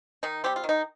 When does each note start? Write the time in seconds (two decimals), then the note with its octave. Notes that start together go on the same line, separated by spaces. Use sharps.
0.23 D#3 D#4
0.44 G3 C4 G4
0.56 F4
0.64 D#3
0.69 D#4